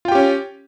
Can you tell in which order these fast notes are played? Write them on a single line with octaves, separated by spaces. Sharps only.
F4 G5 G4 C#4